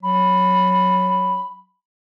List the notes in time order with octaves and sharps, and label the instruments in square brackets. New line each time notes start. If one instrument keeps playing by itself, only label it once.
[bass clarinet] F#3 [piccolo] B5